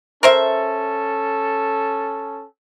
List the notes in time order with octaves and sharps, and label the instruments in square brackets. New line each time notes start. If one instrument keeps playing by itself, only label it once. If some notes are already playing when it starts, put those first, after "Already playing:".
[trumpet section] C#4 A4 [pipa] A#4 C5 E5